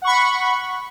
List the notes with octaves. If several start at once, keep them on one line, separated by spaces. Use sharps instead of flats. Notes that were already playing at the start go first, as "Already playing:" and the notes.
F#5 B5 C#6